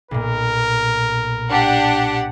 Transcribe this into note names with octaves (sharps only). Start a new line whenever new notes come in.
B1 A#2 A#4
D4 G4 F#5